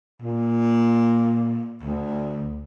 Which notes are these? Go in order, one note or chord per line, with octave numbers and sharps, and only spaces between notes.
A#2
D2